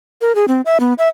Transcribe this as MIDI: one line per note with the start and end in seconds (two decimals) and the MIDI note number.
0.21 0.35 70
0.35 0.45 68
0.48 0.61 60
0.65 0.78 76
0.80 0.94 59
0.98 1.09 76